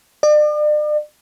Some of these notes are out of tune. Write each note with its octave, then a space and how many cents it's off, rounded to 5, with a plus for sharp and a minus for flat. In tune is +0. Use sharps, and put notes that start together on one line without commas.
D5 +40